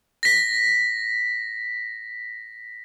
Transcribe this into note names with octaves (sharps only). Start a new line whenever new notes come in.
A#6 B6